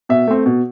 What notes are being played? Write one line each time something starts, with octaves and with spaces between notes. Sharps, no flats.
B2 E5
A3 C4
B2